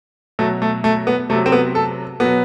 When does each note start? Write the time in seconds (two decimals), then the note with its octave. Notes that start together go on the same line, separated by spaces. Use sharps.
0.39 B2 F#3 A3
0.62 A3
0.84 A3
1.07 B3
1.29 C3 A3
1.33 F#3
1.46 C4
1.52 B3
1.75 A4
2.20 B2 F#3 B3